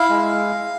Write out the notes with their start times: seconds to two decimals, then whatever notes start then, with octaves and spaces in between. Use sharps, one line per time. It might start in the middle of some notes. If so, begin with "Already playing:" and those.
Already playing: E4 F5
0.09 G#3